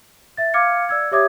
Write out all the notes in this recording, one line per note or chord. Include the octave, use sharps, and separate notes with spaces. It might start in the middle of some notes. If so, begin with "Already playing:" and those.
E5 A6
F5 D6 F6 G#6 C#7
D5 E6 G#6
G4 C#5 E5 D6 D#6 G#6